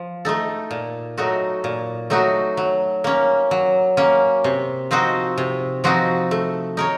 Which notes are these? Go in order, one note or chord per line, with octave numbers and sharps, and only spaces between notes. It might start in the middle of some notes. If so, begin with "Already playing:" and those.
Already playing: F3
A3 D#4 A4
A#2
F#3 A3 D#4 F#4
A#2
F#3 A3 D#4 F#4
F#3
A#3 C#4
F#3
A#3 C#4
C3
F3 C4 D#4 F#4
C3
F3 C4 D#4 F#4
A3
D#4 A#4 C#5